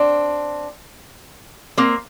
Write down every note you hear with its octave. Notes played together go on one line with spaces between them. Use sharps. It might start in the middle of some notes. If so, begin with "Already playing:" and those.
Already playing: C4 D4
A#3 C4